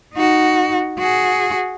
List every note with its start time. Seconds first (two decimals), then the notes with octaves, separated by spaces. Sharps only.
0.14 D#4 F#4
0.98 F#4 G#4